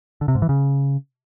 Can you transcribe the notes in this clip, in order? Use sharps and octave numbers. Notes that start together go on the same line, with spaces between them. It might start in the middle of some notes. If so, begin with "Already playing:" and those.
D3
C3
G#2
E3
C#3